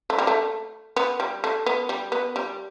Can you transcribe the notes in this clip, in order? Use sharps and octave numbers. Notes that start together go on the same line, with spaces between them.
A3
G3
A3
B3
G3
A3
B3
G3
B3
G3